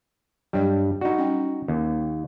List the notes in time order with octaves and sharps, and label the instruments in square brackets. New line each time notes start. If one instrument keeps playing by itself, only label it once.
[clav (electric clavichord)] G2 G3 [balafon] F#3 C#5 D#5
[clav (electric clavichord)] D#4 F#4 [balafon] D5 F#5
[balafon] G3 C#4 G5
[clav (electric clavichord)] D#2